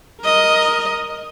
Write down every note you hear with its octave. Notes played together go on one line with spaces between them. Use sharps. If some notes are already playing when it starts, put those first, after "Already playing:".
A#4 D#5